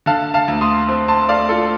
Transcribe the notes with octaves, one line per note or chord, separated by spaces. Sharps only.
D3 F5 A5
F5 A5
D2
C6 D#6
C4
A5 C6
A3 D5 F5
F4 A4